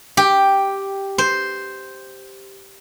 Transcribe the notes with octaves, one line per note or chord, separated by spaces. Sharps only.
G4
C5